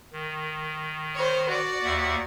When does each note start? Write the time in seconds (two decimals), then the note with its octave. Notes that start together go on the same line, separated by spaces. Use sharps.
0.12 D#3
1.15 C5 C#5
1.49 F#4 D5
1.84 D#2 E5 F#5